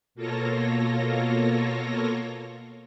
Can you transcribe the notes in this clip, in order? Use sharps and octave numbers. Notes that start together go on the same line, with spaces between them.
B2 A#3 F4 A4 C#5 A#6